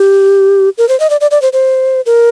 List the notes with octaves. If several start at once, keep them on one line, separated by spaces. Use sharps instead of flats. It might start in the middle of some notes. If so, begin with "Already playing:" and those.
Already playing: G4
A#4
C5
D#5
D5
D5
D5
C5
C5
A#4